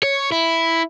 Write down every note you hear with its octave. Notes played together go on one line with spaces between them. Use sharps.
C#5
E4